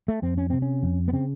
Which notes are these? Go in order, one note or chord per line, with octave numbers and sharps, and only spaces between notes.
A3
F2 C4
C#4
C3 C4
C#4
F2
B3
C#3 C4